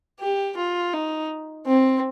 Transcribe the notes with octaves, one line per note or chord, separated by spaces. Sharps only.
G4
F4
D#4
C4